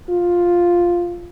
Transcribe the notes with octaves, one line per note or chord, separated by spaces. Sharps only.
F4